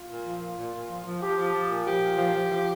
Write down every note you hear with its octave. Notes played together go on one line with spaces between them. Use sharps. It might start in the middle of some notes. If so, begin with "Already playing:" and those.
Already playing: F4
A#2
F3
A#2
A#2
A#2
F3
F3
F3 G4
F3
F3
A#2
F3 G4
A#2
F3
F3
F3